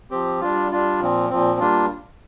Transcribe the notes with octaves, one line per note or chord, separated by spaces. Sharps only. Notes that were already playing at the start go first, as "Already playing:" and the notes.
F3 C4 G4
G3 D4 F4
G3 D4 F4
A#2 F3 C4
A#2 F3 C4
G3 A#3 D4 F4